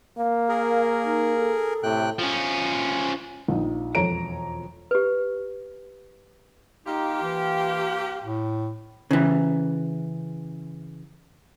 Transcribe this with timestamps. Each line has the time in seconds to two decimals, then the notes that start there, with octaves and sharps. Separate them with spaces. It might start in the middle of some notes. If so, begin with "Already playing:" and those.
0.18 A#3 F5
0.49 G#4 A#4
1.05 D#4
1.37 A4
1.83 A2 C3 G5 F#6
2.19 F3 C#4
3.48 A#1 D#4
3.95 E1 F2 A4 C#5 A#5 D7
4.91 G4 B4
6.86 A#3 D#4 F4 G4
7.23 E3
8.24 A2
9.11 C#3 E3